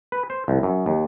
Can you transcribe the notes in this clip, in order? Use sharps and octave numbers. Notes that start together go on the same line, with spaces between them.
B4
C5
C2
F#2
D#2